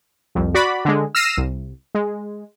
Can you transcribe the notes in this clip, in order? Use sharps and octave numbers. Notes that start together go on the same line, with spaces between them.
C2 F2
F#4 D5 B5
D3 G#3
E6 F6 A#6 C7 D#7 E7
C2
G#3